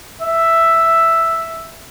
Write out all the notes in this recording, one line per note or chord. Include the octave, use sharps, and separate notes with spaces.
E5